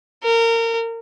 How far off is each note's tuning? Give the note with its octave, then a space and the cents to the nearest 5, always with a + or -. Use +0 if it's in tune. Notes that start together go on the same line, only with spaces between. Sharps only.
A#4 -25